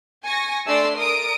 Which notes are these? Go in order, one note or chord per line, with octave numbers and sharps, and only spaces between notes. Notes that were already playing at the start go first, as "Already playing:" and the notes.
G#5 C#6 A#6
A3 D4 D5 C6 E6 C7
A#4 D#6 D7